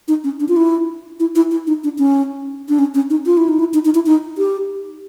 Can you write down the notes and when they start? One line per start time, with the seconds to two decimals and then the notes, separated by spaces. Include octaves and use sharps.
0.08 D#4
0.24 C#4
0.40 D4
0.48 F4
0.56 E4
1.20 E4
1.35 E4
1.51 E4
1.67 D#4
1.84 D4
1.98 C#4
2.69 D4
2.79 C#4
2.94 C#4
3.10 D#4
3.26 F4
3.37 E4
3.48 D#4
3.59 E4
3.74 D#4
3.85 D#4
3.95 E4
4.06 D#4
4.38 G4